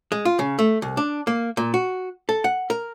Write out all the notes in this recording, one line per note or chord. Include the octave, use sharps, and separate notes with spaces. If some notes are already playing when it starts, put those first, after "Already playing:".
G#3
F4
C#3
A3
C2
D4
A#3
A#2
F#4
A4
F#5
A#4